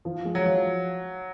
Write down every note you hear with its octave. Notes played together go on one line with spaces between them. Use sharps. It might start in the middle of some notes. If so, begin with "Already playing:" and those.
F3
G#3
F#3
F3